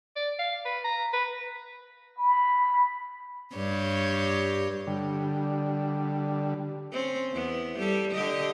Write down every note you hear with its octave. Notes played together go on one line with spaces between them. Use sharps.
D5
F5
B4
A#5
B4
B5
G2 G4 C#5
D3 G3
C4 C#4
E2 B3
G3 G4 A4
D3 G4 D#5